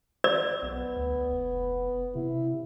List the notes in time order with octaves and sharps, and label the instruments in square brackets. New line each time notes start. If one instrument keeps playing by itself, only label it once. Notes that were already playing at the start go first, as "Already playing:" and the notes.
[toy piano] D5
[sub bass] B1 [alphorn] B3
[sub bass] D2
F1
[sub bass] C3 [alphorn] E4